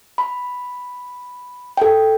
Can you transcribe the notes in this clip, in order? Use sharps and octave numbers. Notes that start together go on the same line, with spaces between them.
B5
A4 G5